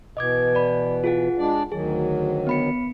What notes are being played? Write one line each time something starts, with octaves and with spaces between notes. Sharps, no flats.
B2 E3 D#5 D6 G#6
D5 B5
F4 G#4 F#5
G#3 D4 D5
D2 D#3 F#3 G#4
B3 B5 C#7